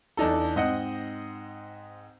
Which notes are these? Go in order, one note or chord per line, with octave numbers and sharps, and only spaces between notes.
E2 D4 D#4 A4
G#2 C4 D#5 F#5